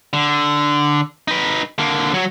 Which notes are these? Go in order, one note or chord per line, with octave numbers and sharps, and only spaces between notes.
D3
D#4 B4
D3 A#3
F#3 C#5